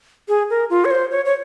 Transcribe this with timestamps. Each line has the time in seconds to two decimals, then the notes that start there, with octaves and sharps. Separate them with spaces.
0.29 G#4
0.50 A#4
0.70 F4
0.85 C#5
0.91 C5
1.11 C#5
1.25 C#5